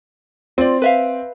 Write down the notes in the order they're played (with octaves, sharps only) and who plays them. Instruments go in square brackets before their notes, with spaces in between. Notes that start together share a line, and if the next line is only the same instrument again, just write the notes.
[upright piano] C4 [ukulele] F4 D5
[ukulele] B4 E5 F5